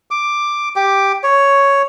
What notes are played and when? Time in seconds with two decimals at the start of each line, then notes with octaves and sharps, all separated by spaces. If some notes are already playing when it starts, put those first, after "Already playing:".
0.11 D6
0.76 G4 D6
1.23 C#5